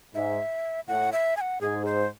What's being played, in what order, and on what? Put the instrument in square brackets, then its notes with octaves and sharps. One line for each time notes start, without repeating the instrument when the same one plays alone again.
[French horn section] G#2 [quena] E5
[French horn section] A2 [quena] F#5
[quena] E5
G#5
F#5
[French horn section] G#2 [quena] G#4
[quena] C5